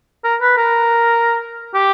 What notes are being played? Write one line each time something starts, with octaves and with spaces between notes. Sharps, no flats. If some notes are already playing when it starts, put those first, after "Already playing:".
A#4
B4
A#4
G4